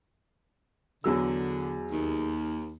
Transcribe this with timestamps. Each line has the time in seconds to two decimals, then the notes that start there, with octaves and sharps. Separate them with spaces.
1.04 E2 D3 F#3 E6
1.91 D#2